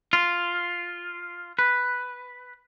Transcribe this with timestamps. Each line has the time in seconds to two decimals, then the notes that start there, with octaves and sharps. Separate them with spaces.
0.13 F4
1.59 B4